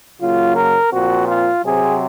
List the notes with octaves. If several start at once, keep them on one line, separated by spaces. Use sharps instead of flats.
C#3 F#3 A#3 F4
A#4
A#2 F3 C4 F#4
F4
C3 F#3 C4 G#4